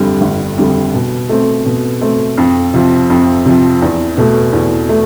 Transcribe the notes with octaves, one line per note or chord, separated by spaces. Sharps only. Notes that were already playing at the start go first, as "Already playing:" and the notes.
Already playing: G1 F2 D3 G3
G1
F2 D3 G3
B2
A3 C4
B2
A3 C4
F2
C3 F3
F2
C3 F3
E2
B2 A3
E2
A3